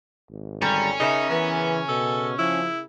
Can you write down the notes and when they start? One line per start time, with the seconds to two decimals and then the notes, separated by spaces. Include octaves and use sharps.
0.30 G#1
0.62 D3 G3 C#4 A#5
1.00 C#3 D#4 A#4 E5
1.30 E3 B3
1.89 B2 A4
2.39 F3 E4